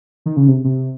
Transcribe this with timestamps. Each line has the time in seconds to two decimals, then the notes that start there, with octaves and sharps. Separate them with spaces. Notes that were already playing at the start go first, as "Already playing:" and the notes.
0.26 D#3
0.37 C#3
0.48 C3
0.64 C3